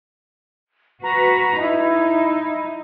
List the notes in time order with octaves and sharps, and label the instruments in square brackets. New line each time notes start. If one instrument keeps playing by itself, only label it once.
[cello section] F#4 B4 [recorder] A#5
[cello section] D#4 [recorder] E4